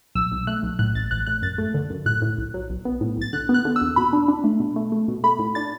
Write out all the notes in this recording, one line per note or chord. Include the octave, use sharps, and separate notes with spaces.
B1 E6
B1
A3 F#6
B1
A2 F#6
A1 A6
A1 F#6
A2 F#6
F#2 A6
A3
D3
F#2
A2 F#6
A2
B1
F#3
B1
B3
A2
B1 A6
D3 F#6
B3
F#6
D3
E6
E2
B2 B5
D4
D4
A3
B2
A3
A3
B2
A3 B5
A2
D4 A6